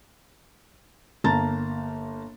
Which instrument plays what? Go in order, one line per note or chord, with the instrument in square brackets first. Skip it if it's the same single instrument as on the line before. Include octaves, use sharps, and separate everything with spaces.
[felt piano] G1 A#3 A5 A#5 A6